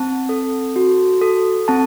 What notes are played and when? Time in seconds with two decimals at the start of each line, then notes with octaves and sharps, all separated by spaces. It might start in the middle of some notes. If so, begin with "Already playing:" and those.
Already playing: C4 A5
0.29 A4
0.76 F#4
1.22 A4
1.68 C4 A5